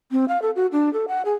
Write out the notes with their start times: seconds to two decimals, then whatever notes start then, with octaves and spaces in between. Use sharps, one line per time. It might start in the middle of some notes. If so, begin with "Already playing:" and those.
0.11 C4
0.28 F5
0.42 A4
0.56 F#4
0.72 D4
0.93 A4
1.08 F#5
1.25 G#4